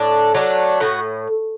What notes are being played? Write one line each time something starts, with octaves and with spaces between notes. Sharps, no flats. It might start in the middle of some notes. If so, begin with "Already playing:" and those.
Already playing: A2 D4
F#3 A3 D4
A2 F#4